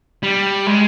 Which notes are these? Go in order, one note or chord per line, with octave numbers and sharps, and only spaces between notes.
G3
G#3